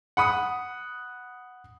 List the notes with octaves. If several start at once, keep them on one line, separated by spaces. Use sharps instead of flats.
F#5 B5 D#6